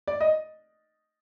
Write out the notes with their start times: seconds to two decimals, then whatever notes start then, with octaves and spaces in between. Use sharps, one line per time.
0.07 D5
0.21 D#5